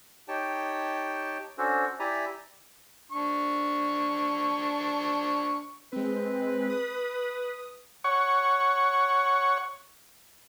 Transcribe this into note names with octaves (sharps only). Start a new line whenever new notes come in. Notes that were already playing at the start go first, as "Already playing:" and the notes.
D#4 G4 C#5 G5 A5
C#4 D4 F#4 A4 C5
E4 G4 D5 E5 G#5 A#5
D4 C#6
G#3 C4 B4
D#6
C#5 F#5 C#6